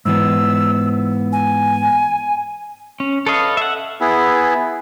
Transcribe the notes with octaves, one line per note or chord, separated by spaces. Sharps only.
G#2 E3 B3 E6
G#5
C#4
A4 B4 C#5 D#5 F5
E5 F#5
B3 E4 G#4